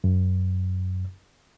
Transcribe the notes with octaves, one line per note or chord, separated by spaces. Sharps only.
F#2